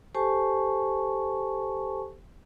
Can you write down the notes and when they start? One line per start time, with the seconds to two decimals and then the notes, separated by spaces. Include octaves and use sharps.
0.15 G4 A4 C5 G#5 A5 C#6